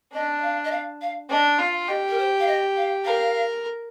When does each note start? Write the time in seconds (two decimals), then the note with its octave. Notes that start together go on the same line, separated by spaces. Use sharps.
0.13 D4 D#5
0.38 D#5
0.42 F5
0.64 D#5
0.71 F5
1.01 F5
1.30 D4 D#5
1.59 F4 F5
1.88 G4 D#5
2.08 A#4
2.18 C5
2.40 F5
2.47 D#5
2.76 F5
3.05 A#4 F5